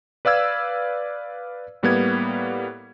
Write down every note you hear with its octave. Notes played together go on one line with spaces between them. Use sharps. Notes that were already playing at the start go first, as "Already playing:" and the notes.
B4 D5 F5 E6 G#6
A2 G3 A#3 B3 B4 G#6